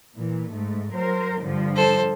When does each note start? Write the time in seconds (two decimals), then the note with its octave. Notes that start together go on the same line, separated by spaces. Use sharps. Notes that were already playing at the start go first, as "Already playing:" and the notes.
0.17 A#2 E3
0.52 G#2 A3
0.94 F#3 A#4 C5
1.43 G2 D3 F3
1.76 A4 C5